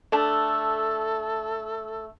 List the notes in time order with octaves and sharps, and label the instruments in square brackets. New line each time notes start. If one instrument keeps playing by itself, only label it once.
[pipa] A3 D4 A5 [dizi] A4